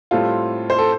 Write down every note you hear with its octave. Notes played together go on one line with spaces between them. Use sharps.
A2 G3 C4 F4 A4
C5
A4